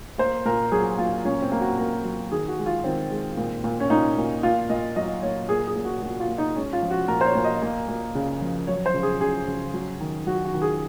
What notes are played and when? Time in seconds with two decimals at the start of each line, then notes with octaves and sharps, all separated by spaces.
0.18 A#3 C5
0.46 A#2 A#4
0.72 F#3 G#4
0.98 A#3 F4
1.25 A#2 C#4
1.42 C4
1.52 A#3
1.61 F#4
1.78 A#2 A#4
2.05 F#3
2.32 D#3 G#4
2.48 F#4
2.57 G#3
2.66 F4
2.84 D#3 C4
3.11 G#3
3.37 A#2
3.64 A#2
3.80 C#4
3.90 A#2 D#4
4.16 A#2
4.43 A#2 F4
4.70 A#2 D#5
4.96 F#3 D#5
5.23 A#2 C#5
5.49 A#2 G#4
5.68 G#4
5.76 A#2
5.85 F#4
6.02 A#2 F#4
6.20 F4
6.29 A#2
6.38 D#4
6.56 G#3 C#4
6.73 F4
6.82 F3
6.91 F#4
7.08 A#2 A#4
7.21 C5
7.26 C#5
7.35 A#2
7.44 D#5
7.62 A#3
7.88 A#3
8.15 C#3
8.41 F3
8.67 F#3 C#5
8.86 C5
8.94 C#3
9.03 G#4
9.20 C#3 G#4
9.47 C#3
9.74 F#3
10.00 D#3
10.27 F#3 F#4
10.45 F#4
10.54 D#3
10.62 G#4